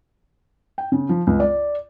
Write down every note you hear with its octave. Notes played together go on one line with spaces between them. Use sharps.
G5
C#3
F3
C#2
D5